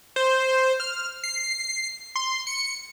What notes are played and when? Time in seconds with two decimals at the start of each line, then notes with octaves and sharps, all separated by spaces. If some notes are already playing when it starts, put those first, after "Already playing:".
0.16 C5
0.80 F6
1.24 C7
2.16 C6
2.47 C#7